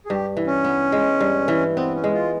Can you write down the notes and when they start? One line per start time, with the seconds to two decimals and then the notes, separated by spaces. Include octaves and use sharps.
0.05 G#4
0.09 G2 G4
0.37 E3
0.47 C#4
0.64 B3
0.92 G#3
1.20 G2
1.48 E3
1.76 B3 C4
1.95 C#4
2.04 G#3
2.14 F4